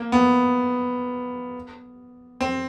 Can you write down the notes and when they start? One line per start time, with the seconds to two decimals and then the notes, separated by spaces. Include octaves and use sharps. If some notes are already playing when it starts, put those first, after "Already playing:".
Already playing: A#3
0.12 B3
2.41 C4